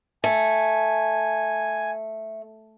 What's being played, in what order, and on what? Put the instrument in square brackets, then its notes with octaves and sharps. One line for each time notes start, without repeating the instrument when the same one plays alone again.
[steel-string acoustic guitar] A3 [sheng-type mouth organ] G#5